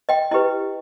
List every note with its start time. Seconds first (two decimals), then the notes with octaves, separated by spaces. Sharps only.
0.09 D#5 G5
0.31 E4 G4 B4 D#5